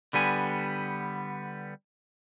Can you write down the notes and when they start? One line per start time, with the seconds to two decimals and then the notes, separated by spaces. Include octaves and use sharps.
0.13 D3 G3 B3 G#5